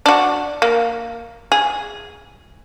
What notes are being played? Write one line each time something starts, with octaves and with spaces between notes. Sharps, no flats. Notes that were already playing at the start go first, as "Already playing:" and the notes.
D4 F#4
A#3
G#4